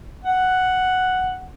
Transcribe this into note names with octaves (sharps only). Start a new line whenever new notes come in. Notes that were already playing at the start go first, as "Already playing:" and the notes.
F#5